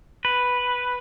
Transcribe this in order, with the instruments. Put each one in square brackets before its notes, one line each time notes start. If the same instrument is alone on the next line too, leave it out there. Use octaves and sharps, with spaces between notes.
[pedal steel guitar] B4